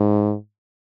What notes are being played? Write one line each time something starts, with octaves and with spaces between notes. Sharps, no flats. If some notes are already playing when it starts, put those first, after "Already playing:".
Already playing: G#2